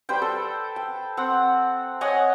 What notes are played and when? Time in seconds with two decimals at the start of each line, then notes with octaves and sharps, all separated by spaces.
0.09 G3 B4 C5 G5
0.22 A4
0.76 G5
1.17 C4 F#5
2.01 C#5 D#5 F#5 G#5